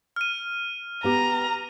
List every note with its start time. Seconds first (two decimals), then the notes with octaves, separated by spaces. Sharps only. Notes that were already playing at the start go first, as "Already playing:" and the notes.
0.16 F6 D#7
1.04 B3 G4 A#5